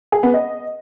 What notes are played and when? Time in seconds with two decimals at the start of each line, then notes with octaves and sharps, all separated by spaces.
0.12 G#4
0.23 B3
0.34 D#5